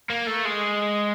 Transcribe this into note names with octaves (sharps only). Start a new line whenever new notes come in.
A#3
A3
G#3